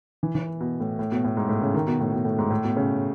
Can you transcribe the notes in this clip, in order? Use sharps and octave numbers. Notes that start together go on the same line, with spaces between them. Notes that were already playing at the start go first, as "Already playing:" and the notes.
E3
E3
B2
A2
A2
B2
A2
G#2
A2
C#3
D#3
B2
A2
B2
A2
G#2
A2
B2
C#3